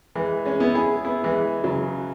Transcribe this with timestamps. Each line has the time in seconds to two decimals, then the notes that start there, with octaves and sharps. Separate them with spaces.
0.15 E3 G#3
0.45 G#3 C#4
0.60 B3 E4
0.75 E4 G#4
1.05 B3 E4
1.24 E3 G#3
1.64 C#3 F#3